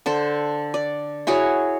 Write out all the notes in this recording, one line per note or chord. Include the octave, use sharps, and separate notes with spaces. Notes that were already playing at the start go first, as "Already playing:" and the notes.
D3 A4 C5
D5
E4 F#4 G#4 C#5